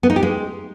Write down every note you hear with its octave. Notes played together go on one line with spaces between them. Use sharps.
B3
D#4
G4
G#3